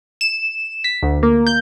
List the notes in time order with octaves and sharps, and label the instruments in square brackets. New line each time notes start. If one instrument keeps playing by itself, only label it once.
[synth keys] E7
B6
D2
A#3
G6